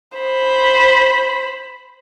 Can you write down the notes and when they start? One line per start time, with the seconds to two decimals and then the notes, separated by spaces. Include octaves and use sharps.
0.18 C5 B5